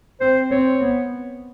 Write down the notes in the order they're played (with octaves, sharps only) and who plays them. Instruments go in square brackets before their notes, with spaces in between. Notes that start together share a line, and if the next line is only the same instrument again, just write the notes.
[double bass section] C4 [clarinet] C5
[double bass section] C4 [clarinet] C#5
[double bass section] B3